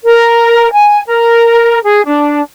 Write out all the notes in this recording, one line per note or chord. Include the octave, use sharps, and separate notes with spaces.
A#4
G#5
A#4
G#4
D4